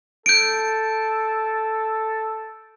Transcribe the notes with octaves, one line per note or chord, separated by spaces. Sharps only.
A4 G6 D7